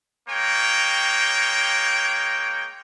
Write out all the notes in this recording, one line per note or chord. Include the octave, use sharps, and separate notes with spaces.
G#3 A#3 C#5 G5